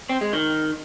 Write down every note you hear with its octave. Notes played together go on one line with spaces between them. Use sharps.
C4
G#3
D#3